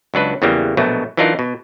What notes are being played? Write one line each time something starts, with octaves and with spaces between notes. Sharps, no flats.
C#2 F#3 D4 B4
E2 C#3 E3 F#3 G3 A#3
A#1 B2 F#3 A3
E3 F#3 D4 D#4 F4 A#4
B2